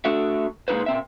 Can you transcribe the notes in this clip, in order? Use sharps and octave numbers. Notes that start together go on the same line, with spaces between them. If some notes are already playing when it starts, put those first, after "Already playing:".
A3 D4 F#4 A4 E5
A#2 G#3 D#4 A4 B4 C5
A#2 C4 E5